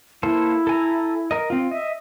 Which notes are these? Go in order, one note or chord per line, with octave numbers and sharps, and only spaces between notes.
A#3 E4 A4 C5
A4 G#5 A#5
A#4 D#5
C4 F4
D#5 E5